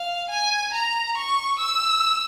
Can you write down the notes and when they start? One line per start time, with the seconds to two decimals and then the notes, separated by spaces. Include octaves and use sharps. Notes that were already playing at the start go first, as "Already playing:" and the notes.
Already playing: F5
0.30 G#5
0.74 A#5
1.18 C#6
1.60 E6